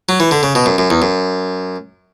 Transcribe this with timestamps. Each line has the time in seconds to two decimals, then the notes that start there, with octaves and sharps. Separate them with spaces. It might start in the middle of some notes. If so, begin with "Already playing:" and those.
0.09 F#3
0.20 E3
0.31 D3
0.43 C#3
0.55 B2
0.66 F#2
0.78 F#2
0.90 E2
1.02 F#2